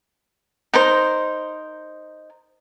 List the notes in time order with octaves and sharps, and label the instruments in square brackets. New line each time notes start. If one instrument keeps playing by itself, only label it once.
[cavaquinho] D#4 A#4 C5